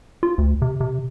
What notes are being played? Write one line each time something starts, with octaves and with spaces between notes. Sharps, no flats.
F4
D2
C3
C3